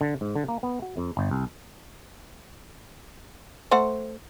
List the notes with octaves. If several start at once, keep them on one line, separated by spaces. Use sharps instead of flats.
D3
G#2
D3
A#3
B3
F#4
F2
G1
C2
A3 C5 F#5